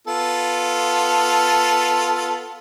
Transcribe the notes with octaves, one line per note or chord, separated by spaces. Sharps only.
B3 F4 A4